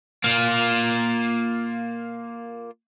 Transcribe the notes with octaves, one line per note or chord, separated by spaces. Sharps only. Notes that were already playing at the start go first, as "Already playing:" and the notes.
A#3 F4